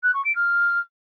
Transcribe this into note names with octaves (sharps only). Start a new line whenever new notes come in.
F#6
C#6
D7
F6